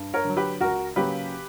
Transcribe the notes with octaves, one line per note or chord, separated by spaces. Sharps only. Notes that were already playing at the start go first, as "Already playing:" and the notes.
Already playing: G2
A#4 C#5
D3 F#3
G4 B4
C#2 F#4 A#4
C#3 F#3 A#3 G4 B4